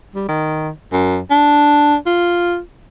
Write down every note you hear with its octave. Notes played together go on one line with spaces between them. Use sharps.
G3
D#3
F#2
D4
F4